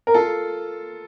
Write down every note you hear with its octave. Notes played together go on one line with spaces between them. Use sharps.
A#4
F4 A4